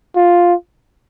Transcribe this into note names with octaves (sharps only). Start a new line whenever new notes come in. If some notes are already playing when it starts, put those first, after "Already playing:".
F4